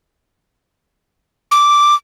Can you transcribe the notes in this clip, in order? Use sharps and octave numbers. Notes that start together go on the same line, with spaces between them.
D6